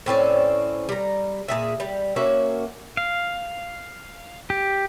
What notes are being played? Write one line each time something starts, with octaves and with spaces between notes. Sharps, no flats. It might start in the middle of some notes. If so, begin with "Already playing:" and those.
A2 C4 C#4 D5
G3 A#5
A#2 G#4 E5
G3
A#3 C#4 F#4 E5
F5
G4